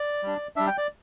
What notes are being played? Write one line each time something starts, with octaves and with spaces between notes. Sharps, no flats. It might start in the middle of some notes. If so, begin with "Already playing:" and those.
Already playing: D5
G3 D4
G3 D4 E5
G5
D5